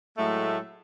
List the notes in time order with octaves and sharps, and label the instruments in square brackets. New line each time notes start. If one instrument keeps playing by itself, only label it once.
[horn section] A2 F#3 G#3 A3